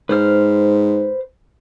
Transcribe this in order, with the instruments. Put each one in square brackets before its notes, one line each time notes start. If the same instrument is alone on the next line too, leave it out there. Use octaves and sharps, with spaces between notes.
[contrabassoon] G#2 [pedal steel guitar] B4 C5 F6